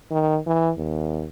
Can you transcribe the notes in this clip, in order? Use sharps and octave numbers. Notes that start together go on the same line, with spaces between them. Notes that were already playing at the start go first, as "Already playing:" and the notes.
D#3
E3
D#2